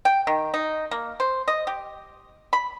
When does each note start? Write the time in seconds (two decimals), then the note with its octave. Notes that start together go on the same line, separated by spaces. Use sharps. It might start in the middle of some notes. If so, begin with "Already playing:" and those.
0.05 G5
0.27 D#3
0.54 D#4
0.91 A#3
1.20 C5
1.48 D#5
1.67 G4
2.53 B5